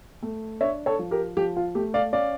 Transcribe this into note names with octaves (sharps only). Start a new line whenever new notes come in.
A3
D4 C#5 E5
A4 C#5
F3
G4 A#4
F3 G4
F4
A3 G4
D5 F5
C#4 D5 F5